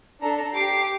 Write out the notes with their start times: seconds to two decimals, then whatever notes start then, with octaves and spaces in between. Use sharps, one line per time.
0.21 D4 A4 A#5
0.53 G4 D6 C7